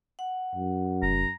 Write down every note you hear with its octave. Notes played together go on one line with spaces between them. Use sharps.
F#5
F#2
F1 A#5